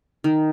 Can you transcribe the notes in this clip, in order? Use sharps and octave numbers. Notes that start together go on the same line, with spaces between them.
D#3